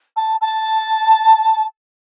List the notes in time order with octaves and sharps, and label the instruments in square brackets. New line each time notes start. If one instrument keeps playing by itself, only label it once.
[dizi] A5
A5